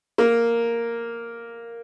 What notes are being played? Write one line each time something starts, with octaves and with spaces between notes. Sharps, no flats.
A#3